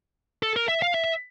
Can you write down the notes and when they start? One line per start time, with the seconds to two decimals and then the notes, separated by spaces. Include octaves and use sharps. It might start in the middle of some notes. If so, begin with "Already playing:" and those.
0.43 A4
0.56 A#4
0.68 E5
0.82 F5
0.94 E5